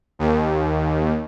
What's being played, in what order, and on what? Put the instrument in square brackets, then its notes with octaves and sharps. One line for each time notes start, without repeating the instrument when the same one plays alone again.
[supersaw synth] D#2